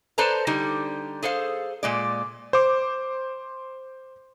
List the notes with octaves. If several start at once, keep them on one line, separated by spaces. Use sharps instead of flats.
A4 B4 C5 D5 A5 A#5
D3 G3 D#4
G#4 A4 C5 F5
A#2 G#3 D5
C5 D6